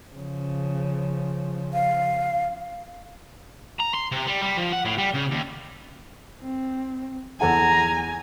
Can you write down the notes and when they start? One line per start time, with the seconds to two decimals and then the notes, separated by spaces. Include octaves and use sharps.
0.12 C#3 F3
1.73 F5
3.79 A#5
3.94 C6
4.12 C3
4.27 G3
4.42 G3
4.57 F3
4.73 F#5
4.85 A2
4.98 G3
5.14 C#3
5.31 D#2
6.41 C4
7.41 E2 A4 F#5 G#5 A#5